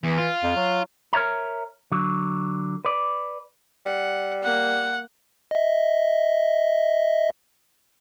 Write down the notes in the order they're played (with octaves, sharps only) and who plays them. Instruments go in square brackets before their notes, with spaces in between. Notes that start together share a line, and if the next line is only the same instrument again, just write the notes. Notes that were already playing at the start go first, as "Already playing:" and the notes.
[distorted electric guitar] E2 [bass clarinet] E3
[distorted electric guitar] F4
[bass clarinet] F2
F#3
[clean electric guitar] A#4 C#5 D5 E5 A#5
D3 F#3
B4 D5
[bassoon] G3 [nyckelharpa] F#5
[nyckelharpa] A#3 [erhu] F#5
[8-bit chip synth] D#5 E5